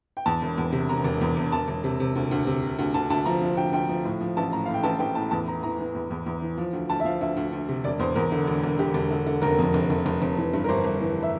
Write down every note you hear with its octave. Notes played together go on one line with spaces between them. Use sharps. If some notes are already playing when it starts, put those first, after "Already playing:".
G5
E2 A5
E1
E2
C3
E1 A#5
E1
E2
E1
E1 A5
E1
C3
C3
D2
D2
C3
C3
D2
D2 A5
D2 A5
F3 A#5
F3
D2 G5
D2 G5
F3
A2
F3
A1 A5
A2 A#5
A2 F5
G5
A1 A5
A1 G5
A2 A5
E2 A5
E3 A#5
E3 A#5
E3
E2
E2
E2
E3
F3
D2
D2 A5
E5
F3 F5
D2 E5
D2
D2
C3
E1 D5
E2 C5
E2 A#4
D3
E1
E1
D3 G4
E1
D3
D3
F1 A#4
F2
F1
F1
F1
F1
E3
G2
A#4
G1 C5
G1
E3
E5